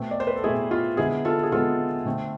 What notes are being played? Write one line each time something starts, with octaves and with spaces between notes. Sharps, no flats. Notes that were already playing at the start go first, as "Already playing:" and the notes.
Already playing: B2 A3 C4
D5
C5
B4
A4
B2 A3 C4 E4 G#4
F4
D3 G#3 B3 E4 G#4
F4 A4
G#4
D3 G#3 B3 F4 A4
D3 A3 C4